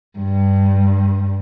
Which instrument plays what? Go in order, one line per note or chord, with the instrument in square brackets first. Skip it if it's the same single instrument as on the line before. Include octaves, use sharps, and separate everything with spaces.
[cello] G2